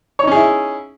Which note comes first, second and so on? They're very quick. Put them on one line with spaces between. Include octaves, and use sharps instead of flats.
C#5 D#4 C#4 G#4 E4